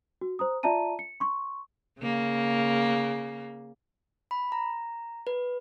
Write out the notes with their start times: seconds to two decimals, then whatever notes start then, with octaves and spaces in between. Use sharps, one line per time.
0.21 F#4
0.39 C5 A#5 D#6
0.63 F4 D5 E5 A5 A#5 D#7
0.99 C#7
1.20 C6 C#6
2.00 C#3 A#3
4.31 B5
4.52 A#5
5.27 B4